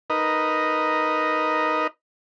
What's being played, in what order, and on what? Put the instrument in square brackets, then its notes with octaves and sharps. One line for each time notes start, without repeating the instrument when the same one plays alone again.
[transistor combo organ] D#4 A#4 B4 D#5